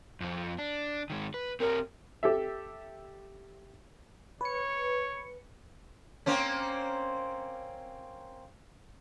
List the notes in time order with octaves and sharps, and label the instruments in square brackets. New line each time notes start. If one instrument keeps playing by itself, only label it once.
[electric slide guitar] F2 F3
D4
D#3 G#3
B4
[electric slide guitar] C4 G4 C#5 [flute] A#4
[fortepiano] G4 A4 E5
[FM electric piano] B4 C#7 [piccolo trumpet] C#5
[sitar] A#3 C4 C#4